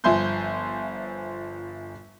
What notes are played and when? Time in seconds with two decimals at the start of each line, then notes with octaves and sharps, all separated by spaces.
0.04 G1 F3 E5 G#5 C6 G6